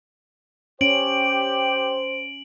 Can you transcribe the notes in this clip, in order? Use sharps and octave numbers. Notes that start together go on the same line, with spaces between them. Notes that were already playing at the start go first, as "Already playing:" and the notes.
C#4 G4 C5 G5 D7 F#7